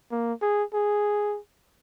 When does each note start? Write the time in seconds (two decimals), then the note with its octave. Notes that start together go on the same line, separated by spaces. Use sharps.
0.11 A#3
0.42 G#4
0.73 G#4